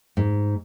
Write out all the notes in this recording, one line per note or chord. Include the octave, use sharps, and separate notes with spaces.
G#2